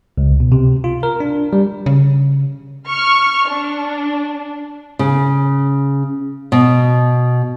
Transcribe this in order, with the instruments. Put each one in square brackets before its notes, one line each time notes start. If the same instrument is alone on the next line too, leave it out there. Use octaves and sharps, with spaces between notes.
[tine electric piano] C#2
B2
C3
F4
A#4
D4
G3
[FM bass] C#3
[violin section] C#6 F6
D4
[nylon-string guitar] C#3
B2